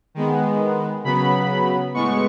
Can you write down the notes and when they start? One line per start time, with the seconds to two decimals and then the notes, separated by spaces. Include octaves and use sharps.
0.15 D#3 G#3 B3
1.04 C#3 F#3 B3 B5
1.94 A2 G#3 B3 C#6